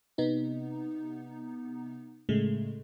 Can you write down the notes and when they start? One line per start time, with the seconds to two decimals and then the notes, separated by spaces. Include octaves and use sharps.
0.18 C3 B3 D#4
2.29 A2 C#3 G#3 A3